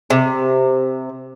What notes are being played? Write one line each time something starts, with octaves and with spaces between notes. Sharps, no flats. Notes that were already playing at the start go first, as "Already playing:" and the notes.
C3